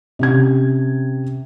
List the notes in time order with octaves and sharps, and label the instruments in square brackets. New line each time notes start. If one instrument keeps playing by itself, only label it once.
[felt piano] C3 C#4 G#6